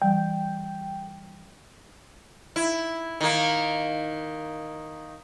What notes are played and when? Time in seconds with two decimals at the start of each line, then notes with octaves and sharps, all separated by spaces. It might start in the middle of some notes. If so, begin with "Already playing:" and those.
0.02 E3 G3 G5
2.56 E4
3.21 D#3 A#3